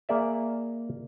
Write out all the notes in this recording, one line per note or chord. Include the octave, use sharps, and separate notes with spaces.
A#3 G#4 D5 E5